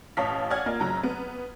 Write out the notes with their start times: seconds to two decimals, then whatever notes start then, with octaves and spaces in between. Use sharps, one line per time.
0.17 A1 A2 C#5 F5 A5 B6
0.50 C#5 D5 F#5 G#5 F6 G#6
0.66 A#3 F4 D#5
0.80 F#1 F#3 A#5
1.03 B3